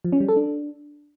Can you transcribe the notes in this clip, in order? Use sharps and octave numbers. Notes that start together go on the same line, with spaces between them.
F3
C#4
G3
A4
D4